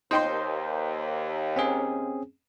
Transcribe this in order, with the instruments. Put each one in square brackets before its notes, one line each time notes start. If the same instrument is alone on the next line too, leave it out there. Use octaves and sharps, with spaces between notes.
[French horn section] D#2 [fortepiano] D#4 G5 C6 [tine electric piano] C5
[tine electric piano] C4 C#4 G#4